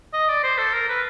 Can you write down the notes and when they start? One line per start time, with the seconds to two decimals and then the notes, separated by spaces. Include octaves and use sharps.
0.13 D#5
0.28 D5
0.44 C5
0.58 A4
0.73 A#4
0.89 B4